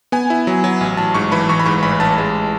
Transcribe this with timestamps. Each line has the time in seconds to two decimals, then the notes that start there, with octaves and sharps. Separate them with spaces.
0.12 B3 G#5
0.30 E4
0.47 F#3
0.64 F#3
0.81 A1
0.97 A1 A5
1.14 G#2 C#6
1.31 E3 B5
1.49 A1 C#6
1.60 B5
1.66 G#2 C#6
1.83 A1 B5
2.00 A1 A5
2.18 G#3